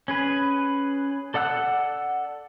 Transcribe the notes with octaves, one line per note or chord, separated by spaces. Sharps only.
C#4 G#4 B4
A4 D5 F#5 E6 F#6